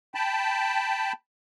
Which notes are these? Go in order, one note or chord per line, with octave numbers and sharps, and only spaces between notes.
G5 A5 B5